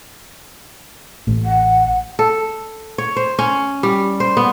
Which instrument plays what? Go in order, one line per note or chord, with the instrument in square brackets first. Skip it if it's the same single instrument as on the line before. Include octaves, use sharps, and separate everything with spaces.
[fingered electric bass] A1 A3
[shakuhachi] F#5
[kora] A4
C#5
C5
C#4
G3
C5
B3